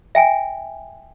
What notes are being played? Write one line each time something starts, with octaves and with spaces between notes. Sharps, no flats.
E5 G5 G#5